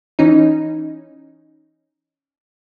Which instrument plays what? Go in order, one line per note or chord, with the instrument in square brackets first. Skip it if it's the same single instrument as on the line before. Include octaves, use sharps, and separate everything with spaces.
[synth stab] E3 C#4 D#4